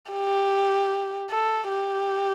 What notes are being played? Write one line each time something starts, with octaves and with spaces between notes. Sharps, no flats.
G4
A4
G4